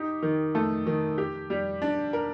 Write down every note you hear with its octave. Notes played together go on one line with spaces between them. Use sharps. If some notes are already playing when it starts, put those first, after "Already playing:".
Already playing: D#4 G4
D#3
A3
D#3
G4
G3
D4
A#4